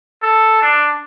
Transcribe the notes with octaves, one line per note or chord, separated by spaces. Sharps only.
A4
D4